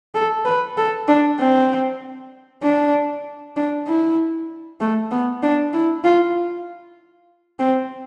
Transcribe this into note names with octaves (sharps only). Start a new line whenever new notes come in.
A4
B4
A4
D4
C4
D4
D4
E4
A3
B3
D4
E4
F4
C4